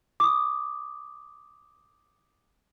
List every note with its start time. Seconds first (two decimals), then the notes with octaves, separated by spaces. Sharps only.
0.20 D6 D#6